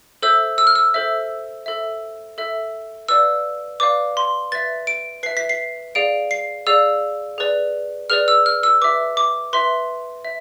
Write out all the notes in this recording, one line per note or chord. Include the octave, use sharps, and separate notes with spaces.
A4 C5 E5 E6
E6
F6
E6
A4 C5 E5
A4 E5
A4 E5
B4 D5 F5 E6
B4 D5 F5 D6
C6
B4 E5 A6
D7
B4 E5 C7
B6
C7
G#4 D5 F5 D7
C7
G#4 D5 F5 E6
G#4 B4 D5
G#4 B4 D5 F6
E6
F6
E6
B4 E5 D6
D6
B4 E5 C6
E5